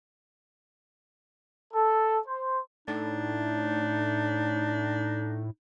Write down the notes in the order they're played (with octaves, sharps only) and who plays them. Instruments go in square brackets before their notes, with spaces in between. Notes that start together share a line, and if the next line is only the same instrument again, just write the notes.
[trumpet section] A4
C5
[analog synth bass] A2 [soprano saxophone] D4 [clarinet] D#4